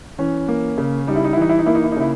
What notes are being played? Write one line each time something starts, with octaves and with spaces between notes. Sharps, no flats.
E3 C#4
A#3
C#3
G3 D#4
E4
D#4
E4
E3 D#4
E4
D#4
A#3 E4
D#4
E4
D#4
C#3 E4